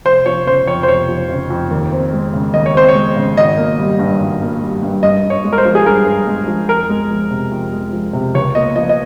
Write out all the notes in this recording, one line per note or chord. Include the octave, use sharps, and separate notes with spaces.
F1 C5
F3 C#5
C#3 C5
F2 C#5
C5
F1 C#5
F3
C#3
F2
D#2
C4
G#3
C#3
D#2 D#5
C#5
C4 C5
C#5
G#3
C#3
G#1 D#5
A#3
G3
G2
G#1
A#3
G3
G2
G2 D#5
G2
C#5
G#3
A#4
C5
F3
G#4
G2 A#4
G2
G#3
F3
F2 A#4
G#3
F3
C3
F2
G#3
F3
C3
C#2 C#5
A#3 D#5
F3 D#5
D#5